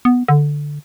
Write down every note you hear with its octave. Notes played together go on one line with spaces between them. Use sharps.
B3
D3